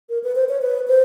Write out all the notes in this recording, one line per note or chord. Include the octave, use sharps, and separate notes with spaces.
A#4
B4
C5
C#5
B4
C5